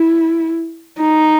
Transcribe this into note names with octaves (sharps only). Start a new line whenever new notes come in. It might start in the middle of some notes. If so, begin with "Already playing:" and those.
Already playing: E4
D#4